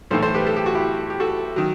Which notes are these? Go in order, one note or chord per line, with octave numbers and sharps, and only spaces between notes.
B1 A2 E3 A4 C5
A4 C5
G4 B4
A4
G4
F#4
E4 G4
G4
F#4 A4
D#3 F#3